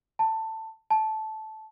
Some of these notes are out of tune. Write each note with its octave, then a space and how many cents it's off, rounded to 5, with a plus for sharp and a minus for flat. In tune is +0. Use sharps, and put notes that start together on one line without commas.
A5 +15
A5 -10